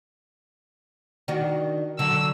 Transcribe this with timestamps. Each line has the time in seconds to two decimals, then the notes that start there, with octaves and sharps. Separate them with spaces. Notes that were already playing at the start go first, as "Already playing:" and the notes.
1.28 D#3 D4 F#4
1.99 D3 F#3 E6